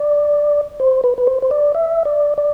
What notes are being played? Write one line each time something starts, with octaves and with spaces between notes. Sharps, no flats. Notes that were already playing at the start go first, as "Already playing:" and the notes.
Already playing: D5
C5
B4
B4
C5
C5
D5
E5
D5
D5